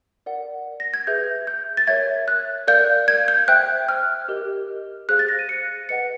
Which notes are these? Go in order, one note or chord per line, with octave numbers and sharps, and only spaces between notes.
A#4 D5 F#5
A#6
G#6
G#4 B4 E5 G6
G6
A6
A#4 C#5 E5 G#6
F#6
A#4 D5 F5 G6
G#6
G6
C5 E5 G5 F#6
F6
G4 A#4 D#5
G#4 C5 F5 F#6
A6
A#6
D#7
C#7
B4 D#5 F#5 C#7